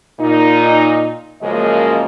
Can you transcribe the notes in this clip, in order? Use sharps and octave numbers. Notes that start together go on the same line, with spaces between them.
A#2 D#4
F#2 C#3 F3 G#3 A#3 D#5